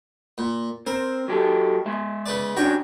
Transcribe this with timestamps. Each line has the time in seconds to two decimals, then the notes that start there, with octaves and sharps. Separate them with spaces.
0.38 A#2
0.87 C4 A#4
1.28 F#3 G4 A4
1.86 G#3 E5
2.26 C#3 B4 D5
2.57 C#4 D4 F#4 C#5 G5